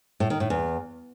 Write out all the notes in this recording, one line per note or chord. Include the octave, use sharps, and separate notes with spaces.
A2
D#3
A2
E2